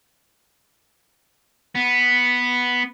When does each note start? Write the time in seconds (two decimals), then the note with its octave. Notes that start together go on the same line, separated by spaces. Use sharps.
1.75 B3